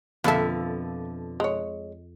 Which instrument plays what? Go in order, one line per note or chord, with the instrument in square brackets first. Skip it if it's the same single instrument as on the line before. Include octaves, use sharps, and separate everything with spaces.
[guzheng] F2 E5 [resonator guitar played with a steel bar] B2 D3 F3 [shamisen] A#3 A4
[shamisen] G#3 C#5